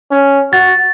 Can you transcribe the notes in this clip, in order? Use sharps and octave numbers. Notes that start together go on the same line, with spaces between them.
C#4
F#4 A6